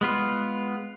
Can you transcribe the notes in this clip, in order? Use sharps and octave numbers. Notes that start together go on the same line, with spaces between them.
G#3 B3 F4